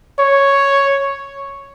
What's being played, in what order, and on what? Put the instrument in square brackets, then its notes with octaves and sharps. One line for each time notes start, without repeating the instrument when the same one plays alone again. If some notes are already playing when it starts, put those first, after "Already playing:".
[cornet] C#5